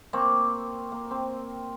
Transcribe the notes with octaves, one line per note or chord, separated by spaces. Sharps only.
A#3 C4 C#6
A#3
C4